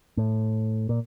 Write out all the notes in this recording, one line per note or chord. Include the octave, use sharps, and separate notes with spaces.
A2
A#2